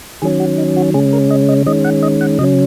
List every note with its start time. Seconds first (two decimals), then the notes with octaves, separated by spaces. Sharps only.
0.22 D#3 F#3 C#4 G#4
0.40 F#4
0.58 D#4
0.77 F#4
0.94 C#3 G#3 C#4 G#4
1.13 A#4
1.31 D#5
1.49 D#5
1.66 D#3 G#3 C#4 D#5
1.84 F#5
2.03 D#5
2.21 F#5
2.39 C#3 F#3 C#4 D#5